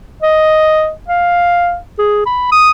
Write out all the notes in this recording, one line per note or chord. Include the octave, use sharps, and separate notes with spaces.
D#5
F5
G#4
B5
D#6